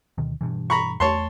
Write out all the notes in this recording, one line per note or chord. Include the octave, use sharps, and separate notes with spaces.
D2 B2 D#3
G2 B2 E3
A#5 B5 C#6
E2 A3 C#5 A5 C6